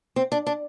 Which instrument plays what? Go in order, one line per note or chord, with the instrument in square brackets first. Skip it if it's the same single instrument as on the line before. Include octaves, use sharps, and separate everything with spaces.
[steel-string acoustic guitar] C4
D4
D4